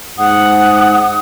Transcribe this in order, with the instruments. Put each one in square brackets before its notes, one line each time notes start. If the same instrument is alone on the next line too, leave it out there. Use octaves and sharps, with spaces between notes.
[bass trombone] G#2 [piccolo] F#5 [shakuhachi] D#6